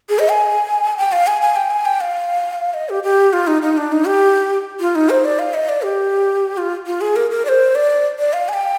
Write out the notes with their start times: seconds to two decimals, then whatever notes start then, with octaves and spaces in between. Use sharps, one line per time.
0.09 G#4
0.19 D#5
0.29 G#5
0.97 G5
1.12 F5
1.27 G#5
1.42 G#5
1.56 G5
1.71 G#5
1.85 G5
2.01 F5
2.74 D#5
2.89 G4
3.03 G4
3.33 F4
3.47 D#4
3.62 D#4
3.77 D4
3.92 D#4
4.07 G4
4.80 F4
4.95 D#4
5.10 C5
5.25 D5
5.39 F5
5.54 D#5
5.69 D5
5.84 G4
6.58 F4
6.87 F4
7.01 G#4
7.16 A#4
7.31 A#4
7.45 D5
7.49 C5
7.75 D5
8.19 D5
8.33 F5
8.49 G#5
8.54 G5